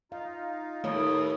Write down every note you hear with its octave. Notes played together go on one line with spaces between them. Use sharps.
D#4 F4 F5
D#2 A3 E4 C#5 D#6